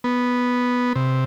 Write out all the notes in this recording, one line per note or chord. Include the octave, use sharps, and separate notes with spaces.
B3
C3